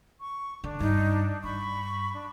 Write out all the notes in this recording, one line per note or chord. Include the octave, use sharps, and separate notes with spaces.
C#6
D3 D4
G2 D#4
G2 B5 C#6
D4